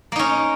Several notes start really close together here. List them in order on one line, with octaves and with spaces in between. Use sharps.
A#3 D#4 C#4